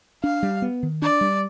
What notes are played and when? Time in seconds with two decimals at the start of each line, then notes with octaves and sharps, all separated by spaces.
0.24 D4 F5
0.43 G3
0.62 B3
0.83 D#3
1.02 D4 D5
1.21 G3